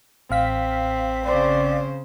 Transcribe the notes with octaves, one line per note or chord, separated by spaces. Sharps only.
A1 C4 F5 B6
C#3 C5 D5